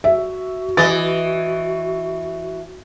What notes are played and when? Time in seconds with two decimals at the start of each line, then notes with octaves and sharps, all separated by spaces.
0.04 F#4 E5
0.77 E3 D#5 A6